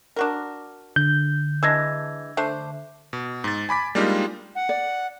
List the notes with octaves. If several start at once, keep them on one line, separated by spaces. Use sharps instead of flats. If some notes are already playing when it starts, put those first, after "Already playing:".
D4 F#4 A#4
D3 G6
E3 G#3 D4 E6 G#6 A#6
A3 D4 C5
B2
G#2 A6
G#5 B5 D6 B6
G3 G#3 A#3 D4 D#4 F4
F#5
D5